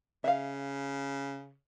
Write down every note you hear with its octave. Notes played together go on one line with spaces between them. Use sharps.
C#3 E5 F5